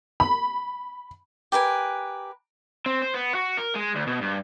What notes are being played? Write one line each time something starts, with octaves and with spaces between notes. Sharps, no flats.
B5
G4 A#4 B4 G#5
C4
C5
B3
F#4
A#4
G#3
D2
B2
G2